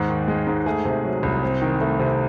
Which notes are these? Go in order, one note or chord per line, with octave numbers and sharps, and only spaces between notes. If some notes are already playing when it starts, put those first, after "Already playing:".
Already playing: D#2 G#2
D#3
G#3
G#2
A3 G#4
C3
F#3
C2
C4
D#3
A3
C3